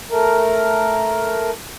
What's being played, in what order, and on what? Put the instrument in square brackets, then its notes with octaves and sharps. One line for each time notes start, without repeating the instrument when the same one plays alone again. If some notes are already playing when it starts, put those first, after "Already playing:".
[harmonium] A3 A#4